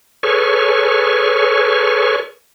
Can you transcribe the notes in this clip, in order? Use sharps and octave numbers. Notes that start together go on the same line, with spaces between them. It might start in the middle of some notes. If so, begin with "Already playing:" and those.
G#4 A4 B4 C#5 C#6 F6